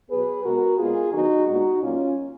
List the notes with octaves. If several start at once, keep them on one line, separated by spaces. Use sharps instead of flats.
B2 F#3 B3 G#4 B4
B2 G#3 B3 F#4 A#4
A#2 G#3 B3 F4 G#4
D#3 F#3 B3 D#4 F#4
A#2 G#3 B3 D#4 F#4
A#2 F#3 A#3 C#4 F4